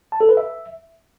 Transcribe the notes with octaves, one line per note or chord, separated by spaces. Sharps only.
A5
A4
B4
E5